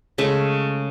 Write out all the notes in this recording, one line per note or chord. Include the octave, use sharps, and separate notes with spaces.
C#3 G#3 A3